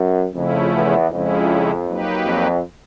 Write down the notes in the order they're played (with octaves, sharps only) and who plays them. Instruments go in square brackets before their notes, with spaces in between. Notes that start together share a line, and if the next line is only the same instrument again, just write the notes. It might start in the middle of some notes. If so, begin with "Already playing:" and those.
Already playing: [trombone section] F#2
[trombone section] F2 [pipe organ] C#3 F3 A3 C#4 E4
[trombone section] E2
[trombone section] F2 [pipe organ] C#3 F3 G#3 C#4 E4
[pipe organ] F#3 A#3 D#4 G4 B4
[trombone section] F2